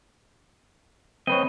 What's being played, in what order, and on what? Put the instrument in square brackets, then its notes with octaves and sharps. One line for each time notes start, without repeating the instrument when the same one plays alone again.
[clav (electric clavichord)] C4 B4 C#5 [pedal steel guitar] D#5